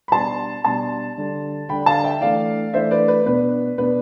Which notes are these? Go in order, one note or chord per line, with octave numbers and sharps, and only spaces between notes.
B5
B2 G3 D4 A5 C6
B2 G3 D4 A5 C6
D3 G3 D4
D3 G3 D4 G5 B5
F5 A5
E5 G5
E3 A3 D4 D5 F5
E3 A3 D4 C5 E5
B4 D5
B4
B2 B3 D4 B4
B2 B3 D4 B4